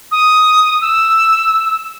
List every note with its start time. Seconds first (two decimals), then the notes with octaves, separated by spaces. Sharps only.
0.12 D#6
0.82 E6